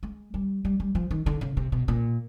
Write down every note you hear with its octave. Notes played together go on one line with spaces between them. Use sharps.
G#3
G3
G3
G3
F3
D#3
D3
C#3
C3
B2
A#2